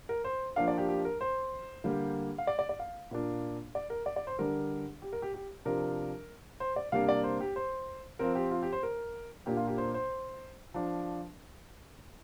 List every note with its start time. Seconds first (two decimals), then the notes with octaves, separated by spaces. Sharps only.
0.09 A#4
0.24 C5
0.56 F3 A#3 D4 F5
0.68 D5
0.78 G4
0.88 G4
1.05 A#4
1.21 C5
1.84 D3 G3 A#3
2.38 F5
2.47 D5
2.59 D5
2.69 D5
2.79 F5
3.11 A#2 A#3 D4
3.75 D5
3.90 A#4
4.06 D5
4.16 D5
4.27 C5
4.39 D3 G3 D4 A#4
5.02 G4
5.13 A#4
5.22 G4
5.34 G4
5.65 C3 F3 D4 A#4
6.60 C5
6.76 D5
6.92 C3 G3 A#3 D4 F5
7.09 D5
7.24 C5
7.41 G4
7.56 C5
8.19 F3 C4 A#4
8.35 G4
8.51 F4
8.62 G4
8.73 C5
8.83 A#4
9.46 A#2 A#3 D4 G4
9.57 F4
9.67 G4
9.78 C5
9.94 C5
10.74 F3 D4